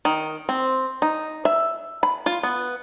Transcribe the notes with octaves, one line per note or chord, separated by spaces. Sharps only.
D#3
C4
D#4
E5
B5
F4
B3